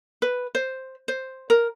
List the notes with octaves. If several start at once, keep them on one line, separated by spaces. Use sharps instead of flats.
B4
C5
C5
A#4